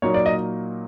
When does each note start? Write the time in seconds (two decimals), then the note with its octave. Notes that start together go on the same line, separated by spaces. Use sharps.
0.02 A#2 F#3 A#3 D#4 C#5
0.14 D5
0.26 D#5